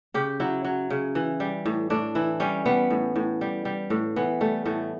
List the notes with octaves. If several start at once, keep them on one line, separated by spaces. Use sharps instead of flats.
C#3 G4
F#3 E4
F#3
C#3
E3
G3
A2
A2 D4
E3 E4
G3 C#4
G3 B3
A2
A2
G3
G3
A2
E3 B3
G3 A3
A2 A3